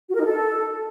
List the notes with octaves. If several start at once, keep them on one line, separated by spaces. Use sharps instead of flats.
F#4
A#4
D#4
A4